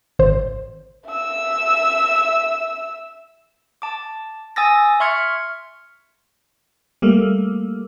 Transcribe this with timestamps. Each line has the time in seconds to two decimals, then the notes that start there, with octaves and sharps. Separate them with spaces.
0.19 G#1 C5
1.07 E5 E6
3.82 A5 D6
4.56 G#5 D#6 E6 A6 A#6
5.00 E5 C6 C#6 F6 G#6 C#7
7.02 G3 A3 A#3